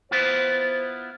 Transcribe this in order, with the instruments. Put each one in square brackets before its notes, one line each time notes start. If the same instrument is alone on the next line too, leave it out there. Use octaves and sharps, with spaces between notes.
[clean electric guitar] B3 E4 F4 [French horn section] C5